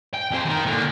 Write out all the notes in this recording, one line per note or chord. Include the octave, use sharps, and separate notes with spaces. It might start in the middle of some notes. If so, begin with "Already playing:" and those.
G5
F2 C5
D#3 E3
A#2 D3